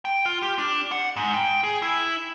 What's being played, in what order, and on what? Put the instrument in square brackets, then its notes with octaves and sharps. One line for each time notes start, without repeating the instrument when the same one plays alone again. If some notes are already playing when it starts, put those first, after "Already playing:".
[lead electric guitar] G5
F4
G4
D4
F#5
G#2
G5
G#4
E4